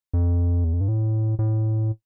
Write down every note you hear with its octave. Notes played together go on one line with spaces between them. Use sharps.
F2
E2
F2
G2
A2
A2